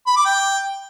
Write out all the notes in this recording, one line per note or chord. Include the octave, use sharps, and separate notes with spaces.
B5
D6
G5